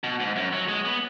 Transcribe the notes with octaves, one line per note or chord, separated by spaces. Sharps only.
B2
G#2
F#2
F#3
G#3
B3